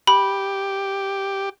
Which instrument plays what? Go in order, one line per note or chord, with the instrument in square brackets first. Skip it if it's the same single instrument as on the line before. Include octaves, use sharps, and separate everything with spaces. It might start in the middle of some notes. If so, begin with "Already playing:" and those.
[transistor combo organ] G4 [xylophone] B5